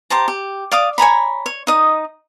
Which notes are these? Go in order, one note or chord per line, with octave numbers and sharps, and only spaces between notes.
G4 C5 A5 A#5
G4
D5 F5 D6 D#6
C#5 G#5 A#5 B5
C#5
D#4 D#5 D#6